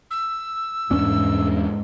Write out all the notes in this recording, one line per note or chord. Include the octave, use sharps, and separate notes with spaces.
E6
E2 G#2 C#4 D4